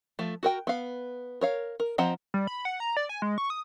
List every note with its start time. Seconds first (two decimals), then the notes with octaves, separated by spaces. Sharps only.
0.19 F3 A3
0.43 F#4 A#4 G5
0.67 B3 F5
1.41 A#4 C#5 F5
1.80 A#4
1.98 F3 C4 D#5 F#5 A#5
2.34 G3
2.47 B5
2.65 F#5
2.80 A#5
2.97 D5
3.09 G#5
3.22 G#3
3.38 C#6
3.50 D#6